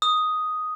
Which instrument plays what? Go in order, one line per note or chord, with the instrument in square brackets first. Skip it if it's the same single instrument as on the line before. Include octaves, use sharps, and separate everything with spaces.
[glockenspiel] D#6